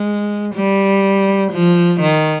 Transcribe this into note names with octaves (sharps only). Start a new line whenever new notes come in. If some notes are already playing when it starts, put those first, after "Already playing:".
Already playing: G#3
G3
F3
D#3